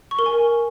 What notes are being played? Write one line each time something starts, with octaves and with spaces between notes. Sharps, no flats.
C#6
A#4
G#5